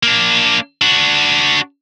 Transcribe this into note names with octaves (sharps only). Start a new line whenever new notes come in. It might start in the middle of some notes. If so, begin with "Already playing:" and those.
A#3 D4
D4 F#4